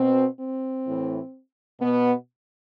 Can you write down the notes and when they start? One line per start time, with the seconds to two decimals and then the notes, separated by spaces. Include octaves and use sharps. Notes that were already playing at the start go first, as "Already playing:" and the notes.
Already playing: B2 C4
0.40 C4
0.87 A2 E3
1.81 B2 B3